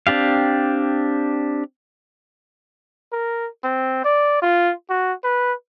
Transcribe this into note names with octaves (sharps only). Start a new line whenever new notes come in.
C4 D4 G4 F5
A#4
C4
D5
F4
F#4
B4